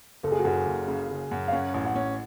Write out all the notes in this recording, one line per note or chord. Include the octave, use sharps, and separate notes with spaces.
F#1 A4
G#4
F#4
F#2 G#4
F#1
C#3
C#3
F#2
F5
C#4 F#5
A1
F#5
C#4